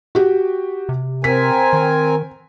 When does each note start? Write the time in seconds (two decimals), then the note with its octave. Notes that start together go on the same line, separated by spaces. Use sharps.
0.15 F#4 G4
0.89 C3
1.24 C4 A#4 G#5 B6
1.73 D#3